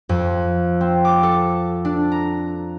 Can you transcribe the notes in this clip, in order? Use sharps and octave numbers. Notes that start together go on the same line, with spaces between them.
F2
C4
D6
A4
D4
A#5